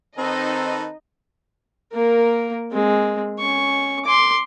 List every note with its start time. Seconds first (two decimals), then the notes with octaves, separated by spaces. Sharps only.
0.18 D#3 C4 D#4 A4 B4 D#5
1.93 A#3 A#4
2.72 G#3 C4
3.39 C#4 C#6
4.05 C6 D6